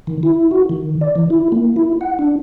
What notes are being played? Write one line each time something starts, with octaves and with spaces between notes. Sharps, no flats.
D#3
E4
F#4
D#3
D5
E3
E4
A#3
E4
F#5
D4